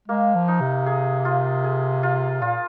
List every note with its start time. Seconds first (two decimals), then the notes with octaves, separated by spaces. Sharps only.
0.08 G#3 A#3
0.35 F3
0.48 D#4
0.61 C3
0.86 G#4
1.25 F4
1.64 G#4
2.03 F4
2.42 A#2 F4